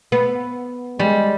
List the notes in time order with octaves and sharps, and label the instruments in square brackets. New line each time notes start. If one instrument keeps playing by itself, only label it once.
[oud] B3
[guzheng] G3 [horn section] G#3